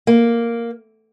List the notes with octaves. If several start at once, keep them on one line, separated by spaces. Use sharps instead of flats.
A#3